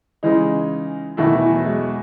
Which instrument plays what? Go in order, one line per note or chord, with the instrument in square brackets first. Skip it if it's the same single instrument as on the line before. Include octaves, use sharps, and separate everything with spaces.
[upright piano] C#3 G#3 D#4 [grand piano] E3
[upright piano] E2 B2 A3 E4 [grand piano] D#3
[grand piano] E3
F#3
G#3